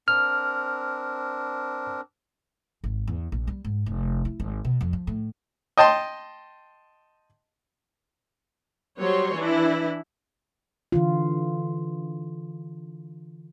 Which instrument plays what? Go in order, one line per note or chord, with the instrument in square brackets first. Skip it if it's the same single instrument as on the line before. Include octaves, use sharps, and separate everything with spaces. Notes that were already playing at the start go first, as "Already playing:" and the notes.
[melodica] C4 D4 A#4 [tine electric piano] F6
[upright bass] G#1
E2
A#1
G3
G#2
F1
E4
G#1
B2
F2
F3
A2
[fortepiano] D#5 G5 A5 C6
[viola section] F#3 G3 C5 C#5 C6
E3 D4 E4
[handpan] D3 E3 F4